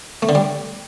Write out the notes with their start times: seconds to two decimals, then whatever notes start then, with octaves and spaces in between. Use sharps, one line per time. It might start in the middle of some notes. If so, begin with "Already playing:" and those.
0.22 A3
0.29 D3
0.35 G3